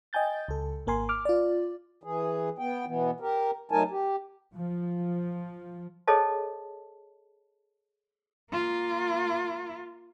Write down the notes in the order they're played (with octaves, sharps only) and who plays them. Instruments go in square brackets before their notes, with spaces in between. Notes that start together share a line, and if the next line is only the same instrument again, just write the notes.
[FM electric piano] D#5 G5 G#5 G6 A6
C#2 A4
G#1 A#3 A#4 G#5 C6
D6 F6
F4 D5
[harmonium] E3 G#4
B3 G5
B2 E3 B3
G4 A#4
F#3 A3 D#4 A#4 G#5 A5
G4
[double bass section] F3
[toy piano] G#4 A4 C5 C#5 D#5 A5
[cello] A#3 F4